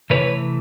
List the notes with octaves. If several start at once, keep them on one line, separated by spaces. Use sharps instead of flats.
C3 E3 A3 B4 C#5